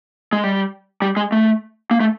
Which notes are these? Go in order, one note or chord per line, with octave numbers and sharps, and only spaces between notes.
G#3
G3
G3
G#3
A3
A#3
A3